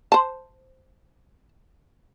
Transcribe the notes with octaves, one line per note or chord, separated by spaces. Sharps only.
C5 A5